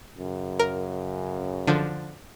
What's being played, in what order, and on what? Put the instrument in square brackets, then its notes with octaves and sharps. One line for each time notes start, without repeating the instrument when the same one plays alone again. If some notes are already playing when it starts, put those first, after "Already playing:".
[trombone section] F#2 C#3
[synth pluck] A#4
D3 F3